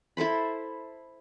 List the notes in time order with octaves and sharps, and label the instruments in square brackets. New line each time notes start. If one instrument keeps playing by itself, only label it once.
[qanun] E4 A4 C5 B5